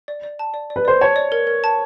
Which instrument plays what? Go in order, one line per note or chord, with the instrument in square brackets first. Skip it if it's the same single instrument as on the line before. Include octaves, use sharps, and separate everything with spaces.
[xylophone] D5
D5
A5
D5
D5
[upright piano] B4
[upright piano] C5 [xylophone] D5
[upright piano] C#5 [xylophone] A5
[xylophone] D5
A#4
A#4
A5